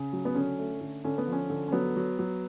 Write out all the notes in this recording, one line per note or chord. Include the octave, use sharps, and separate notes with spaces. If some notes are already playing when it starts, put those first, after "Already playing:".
Already playing: C#3
F#3
B3
D3 C#4
A3
D3
D3 C#4
B3
F3 C#4
D3
C#4
F#3 B3
F#3
F#3